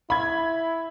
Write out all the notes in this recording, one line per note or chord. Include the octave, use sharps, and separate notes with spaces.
E4 B5 G#6